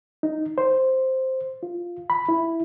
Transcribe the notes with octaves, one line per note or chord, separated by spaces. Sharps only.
D#4
C5
F4
B5
E4